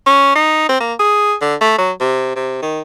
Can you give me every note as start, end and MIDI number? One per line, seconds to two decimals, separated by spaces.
0.06 0.35 61
0.35 0.68 63
0.69 0.77 60
0.80 0.94 58
0.99 1.34 68
1.42 1.55 50
1.61 1.76 57
1.78 1.92 54
2.00 2.33 48
2.36 2.59 48
2.62 2.81 51